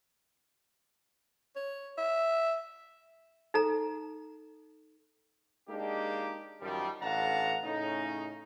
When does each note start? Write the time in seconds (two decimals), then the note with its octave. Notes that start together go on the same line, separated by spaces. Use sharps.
1.56 C#5
1.98 E5
3.54 D#4 A4 A#5
5.69 G#3 A#3 D4 D#4 G4
6.61 F#2 D#3 F3 G3
7.02 A1 D4 F5 F#5 A5 A#5
7.64 A2 C#3 C#4 D#4